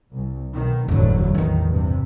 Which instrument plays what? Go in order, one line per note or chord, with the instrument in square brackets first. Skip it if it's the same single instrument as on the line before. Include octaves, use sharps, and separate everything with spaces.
[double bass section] C2
B1 D#3
[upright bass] F#1 E2 [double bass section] A2 D3 F#3
[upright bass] A1 E2 [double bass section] D#3
[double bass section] G2 C3